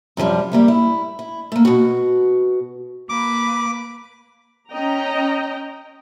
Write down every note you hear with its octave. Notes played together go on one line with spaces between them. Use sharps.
F#2 C3 F3 G3
G3 A#3 E5
E4
E4
A3 A#3
B2 F#4
A#3 B4 D6
C#4 D#5 G5 A#5